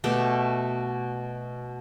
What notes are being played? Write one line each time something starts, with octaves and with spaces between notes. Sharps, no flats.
B2 A3 G4